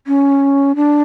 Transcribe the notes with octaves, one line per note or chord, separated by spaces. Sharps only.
C#4
D4